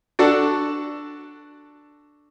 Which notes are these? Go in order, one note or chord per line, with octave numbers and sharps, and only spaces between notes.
D4 F#4 A4 A5